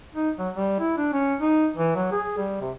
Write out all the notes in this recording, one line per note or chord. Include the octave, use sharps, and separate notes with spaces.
D#4
F#3
G3
E4
D4
C#4
D#4
E3
F#3
G#4
G3
C3